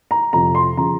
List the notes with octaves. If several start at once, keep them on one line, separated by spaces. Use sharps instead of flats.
A#5
F2 C3 F3 A#5
C6
C#3 F3 A#5